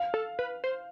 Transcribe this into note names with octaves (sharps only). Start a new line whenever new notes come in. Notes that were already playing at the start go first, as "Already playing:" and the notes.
Already playing: F5
A4
B4
C5